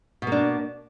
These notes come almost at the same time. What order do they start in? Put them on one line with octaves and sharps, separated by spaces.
B2 A#3 D4